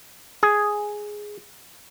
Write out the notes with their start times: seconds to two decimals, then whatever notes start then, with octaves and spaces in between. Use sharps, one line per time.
0.43 G#4